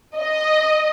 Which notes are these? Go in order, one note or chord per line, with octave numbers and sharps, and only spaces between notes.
D#5